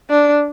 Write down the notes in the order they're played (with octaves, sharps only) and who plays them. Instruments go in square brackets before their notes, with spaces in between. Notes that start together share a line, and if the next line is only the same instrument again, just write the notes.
[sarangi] D4